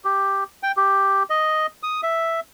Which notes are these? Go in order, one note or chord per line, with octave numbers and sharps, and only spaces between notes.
G4
G5
G4
D#5
D#6
E5